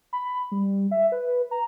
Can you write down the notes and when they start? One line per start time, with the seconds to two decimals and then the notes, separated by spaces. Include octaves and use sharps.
0.13 B5
0.52 G3
0.91 E5
1.12 B4
1.51 A#5